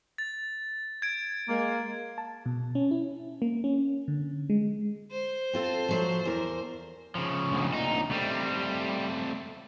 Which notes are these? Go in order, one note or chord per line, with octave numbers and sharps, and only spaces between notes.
A6
G#6 D7
G#3 A#3
A5
B2
C#4
E4
A#3
C#4
D3
G#3
C5
C4 F4 A4
F3 F#3 A3
E2 A#4
C#3 F3
D2 A#2
D#4
G3 A3 C4